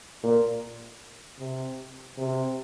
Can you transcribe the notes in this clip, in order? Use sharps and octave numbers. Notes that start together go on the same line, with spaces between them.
A#2
C3
C3